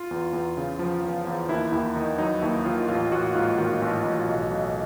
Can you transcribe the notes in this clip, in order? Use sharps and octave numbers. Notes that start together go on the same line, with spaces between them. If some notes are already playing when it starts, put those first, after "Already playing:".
Already playing: F4
E2
E2
C#3
F3
E2
E2
D#2 E4
D#2 E4
D#3 D#4
F#3 D#4
D#2 E4
D#2 F4
A1 F4
A1 F#4
G#2 F4
D#3 F#4
A1
A1
B1
B1